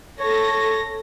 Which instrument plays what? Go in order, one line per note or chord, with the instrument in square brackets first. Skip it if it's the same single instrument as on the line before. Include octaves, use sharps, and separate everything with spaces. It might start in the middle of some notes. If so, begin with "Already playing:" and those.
[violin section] A4 A#6 [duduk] C#5